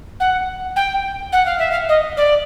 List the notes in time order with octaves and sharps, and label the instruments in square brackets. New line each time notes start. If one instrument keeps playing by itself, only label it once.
[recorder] F#5
G5
F#5
F5
E5
F5
D#5
D5